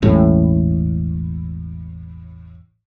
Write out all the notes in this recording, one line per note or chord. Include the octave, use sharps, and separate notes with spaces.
E1 A1 A2